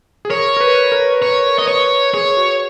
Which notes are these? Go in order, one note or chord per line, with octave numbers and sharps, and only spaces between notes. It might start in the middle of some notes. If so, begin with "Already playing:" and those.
G#4
A#4 C#5
A#4
B4
A#4
C#5
D#5
C#5
G#4 C#5
F#4